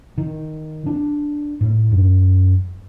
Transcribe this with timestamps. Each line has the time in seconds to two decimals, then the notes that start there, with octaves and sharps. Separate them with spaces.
0.18 D#3
0.86 D4
1.61 A2
1.92 F#2